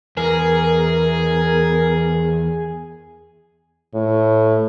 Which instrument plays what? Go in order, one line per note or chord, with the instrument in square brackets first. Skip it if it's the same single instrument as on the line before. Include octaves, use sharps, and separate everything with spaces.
[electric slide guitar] E2 [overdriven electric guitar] G#4 [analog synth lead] A#4
[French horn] A2